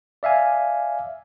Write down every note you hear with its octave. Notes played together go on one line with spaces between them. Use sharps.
D5 E5 F5 G#5